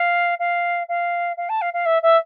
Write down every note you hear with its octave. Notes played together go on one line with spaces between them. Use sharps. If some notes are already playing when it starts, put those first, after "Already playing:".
Already playing: F5
F5
F5
F5
A5
F5
F5
E5
E5